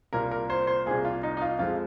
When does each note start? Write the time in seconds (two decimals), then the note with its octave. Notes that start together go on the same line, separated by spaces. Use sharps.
0.13 C2 A#2 A#3 A#4
0.31 A#4
0.50 C5
0.67 C5
0.86 C2 A#2 A#3 G#4
1.05 F4
1.23 D#4
1.37 D#4
1.42 F4
1.59 F2 F3 G#3 F4